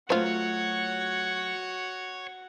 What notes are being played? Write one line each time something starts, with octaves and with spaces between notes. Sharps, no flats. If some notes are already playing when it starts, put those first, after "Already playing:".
F#3 A3 F4 F#4 C5 C#5 F#5